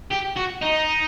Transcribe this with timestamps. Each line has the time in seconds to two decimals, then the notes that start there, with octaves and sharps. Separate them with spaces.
0.12 G4
0.37 F#4
0.62 D#4